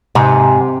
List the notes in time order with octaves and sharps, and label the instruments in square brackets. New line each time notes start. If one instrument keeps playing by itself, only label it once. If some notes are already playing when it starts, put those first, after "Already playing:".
[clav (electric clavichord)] G#2 [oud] C3